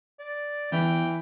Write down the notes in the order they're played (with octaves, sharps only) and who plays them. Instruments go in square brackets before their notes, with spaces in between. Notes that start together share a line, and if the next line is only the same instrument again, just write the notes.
[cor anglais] D5
[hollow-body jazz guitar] E2 [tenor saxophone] E3 [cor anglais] G5